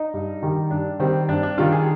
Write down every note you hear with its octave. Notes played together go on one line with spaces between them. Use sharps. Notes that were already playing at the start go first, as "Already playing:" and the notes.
Already playing: D#4
G2
D#3 G3
G2 D4
D#3 G3 C4
G2 D4
D4
D#3 G3 F4
G#4